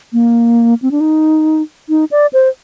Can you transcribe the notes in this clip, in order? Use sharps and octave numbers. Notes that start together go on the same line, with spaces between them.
A#3
C4
D4
D#4
D#4
D5
C5